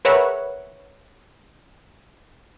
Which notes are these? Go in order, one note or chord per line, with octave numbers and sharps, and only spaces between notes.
G#4 A#4 B4 C#5 E5 F#5